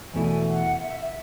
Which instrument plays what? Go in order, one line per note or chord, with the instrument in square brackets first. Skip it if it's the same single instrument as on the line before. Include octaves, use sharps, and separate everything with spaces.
[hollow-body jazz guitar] E2 B2 A3 E4 [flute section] G#5
[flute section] F#5
E5
E5